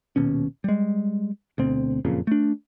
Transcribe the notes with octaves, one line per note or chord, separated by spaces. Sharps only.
D#1 D#2 B2 C#4
G3 G#3
D2 B2 C4
F#1 F2 A#2 C#3
A3 D4